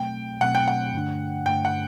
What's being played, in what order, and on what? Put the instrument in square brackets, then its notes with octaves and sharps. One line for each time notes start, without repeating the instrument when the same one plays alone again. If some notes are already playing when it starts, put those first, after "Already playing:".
Already playing: [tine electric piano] B2 F#3 A3 C4 [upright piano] G5
[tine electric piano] B2 F#3 A3 C4 [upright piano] F#5
[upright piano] G5
F#5
[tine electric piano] G2 D3 A3 D4
[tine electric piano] G2 D3 A3 D4 [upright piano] G5
[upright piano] F#5